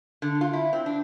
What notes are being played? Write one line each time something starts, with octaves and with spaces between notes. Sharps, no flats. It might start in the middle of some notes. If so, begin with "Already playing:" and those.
D3
F4
E4
C4
D4